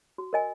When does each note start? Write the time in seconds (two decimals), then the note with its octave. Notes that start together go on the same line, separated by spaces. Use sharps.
0.18 F#4
0.33 A#4 D#5 G#5